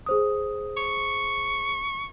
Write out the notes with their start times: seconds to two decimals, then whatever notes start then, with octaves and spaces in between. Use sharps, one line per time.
0.06 G#4 C5 D#6
0.77 C#6